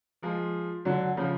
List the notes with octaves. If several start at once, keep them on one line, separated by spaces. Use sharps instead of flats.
F3 G#3
D3 F#3
C#3 F3